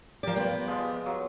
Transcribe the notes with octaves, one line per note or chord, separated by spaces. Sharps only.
F3 G4 A#4 D5
B3 F4 G5
F3 G#3 F4
F#3